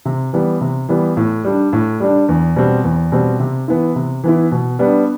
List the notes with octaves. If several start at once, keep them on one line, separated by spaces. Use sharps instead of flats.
C3
E3 G3 B3
C3
E3 G3 B3
A2
G3 D4
A2
G3 D4
E2
B2 G3 C4
E2
B2 G3 C4
C3
E3 B3 E4
C3
E3 B3 E4
B2
G3 B3 D4